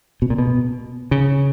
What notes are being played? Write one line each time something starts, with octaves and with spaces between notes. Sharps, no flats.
B2
A#2
B2
C#3